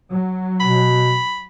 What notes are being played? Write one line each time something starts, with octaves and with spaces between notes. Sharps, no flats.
F#3
B2 B5